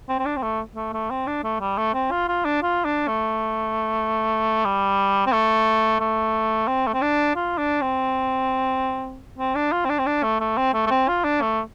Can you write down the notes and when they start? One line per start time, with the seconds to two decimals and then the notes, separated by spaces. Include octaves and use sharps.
0.09 C4
0.19 C4
0.26 D4
0.37 C4
0.43 A3
0.76 A3
0.93 A3
1.11 C4
1.27 D4
1.44 A3
1.60 G3
1.78 A3
1.94 C4
2.11 F4
2.28 F4
2.45 D4
2.62 F4
2.85 D4
3.08 A3
4.65 G3
5.26 C4
5.32 A3
6.00 A3
6.67 C4
6.87 A3
6.94 C4
7.02 D4
7.36 F4
7.58 D4
7.81 C4
9.39 C4
9.55 D4
9.72 F4
9.85 C4
9.90 D4
9.99 C4
10.06 D4
10.23 A3
10.40 A3
10.57 C4
10.74 A3
10.86 A3
10.91 C4
11.08 F4
11.24 D4
11.42 A3